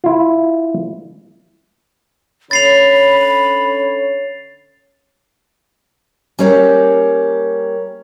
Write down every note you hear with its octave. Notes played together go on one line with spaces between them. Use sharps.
E4 F4
D3 C#4 C#5 B5 A6 C7 F7
G3 A#3 C#4 G4 C#5